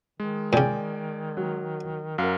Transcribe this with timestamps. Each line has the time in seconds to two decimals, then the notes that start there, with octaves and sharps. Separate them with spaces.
0.20 D#3 G#3
0.53 A#2 C#3 D5 G5 G#5
1.37 F#3
2.18 F#2 F#4 A#4 F5